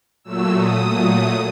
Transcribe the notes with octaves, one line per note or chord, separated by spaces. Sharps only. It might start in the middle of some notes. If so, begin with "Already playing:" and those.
A#2 F#3 A3 E6
D#6
A#2 F#3 A3